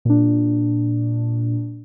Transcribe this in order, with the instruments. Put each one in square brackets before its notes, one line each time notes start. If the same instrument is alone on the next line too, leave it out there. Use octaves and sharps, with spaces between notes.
[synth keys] A#2 D4